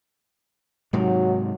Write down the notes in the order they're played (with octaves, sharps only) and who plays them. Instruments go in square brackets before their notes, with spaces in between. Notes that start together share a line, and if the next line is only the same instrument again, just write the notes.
[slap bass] G#2 C3 D#3 [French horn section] F#3